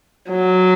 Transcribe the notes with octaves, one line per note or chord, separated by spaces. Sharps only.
F#3